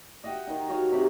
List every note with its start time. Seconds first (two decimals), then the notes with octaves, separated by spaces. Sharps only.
0.24 D#5 E5 F#5 G5
0.47 D#3 D#4
0.68 F#4 A4 C#5 F5
0.92 C3 D#4 G4 B5